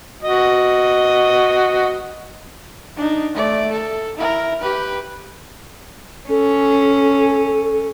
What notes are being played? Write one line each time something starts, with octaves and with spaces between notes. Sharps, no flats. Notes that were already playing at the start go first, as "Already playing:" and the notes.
F#4 D#5
D4 D#4
A3 D5
A4
E4 A#4
G4 B4
C#4 A4